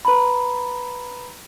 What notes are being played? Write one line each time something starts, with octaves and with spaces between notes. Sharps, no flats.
B4 A#5 B5